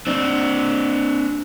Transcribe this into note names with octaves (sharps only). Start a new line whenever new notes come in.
C4 D4